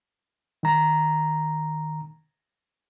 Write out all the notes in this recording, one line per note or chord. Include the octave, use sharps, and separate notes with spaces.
D#3 A#5